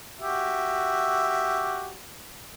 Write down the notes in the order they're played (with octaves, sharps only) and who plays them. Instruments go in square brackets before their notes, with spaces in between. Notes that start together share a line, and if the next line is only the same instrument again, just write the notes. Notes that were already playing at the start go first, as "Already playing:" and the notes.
[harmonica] F#4 G4 E5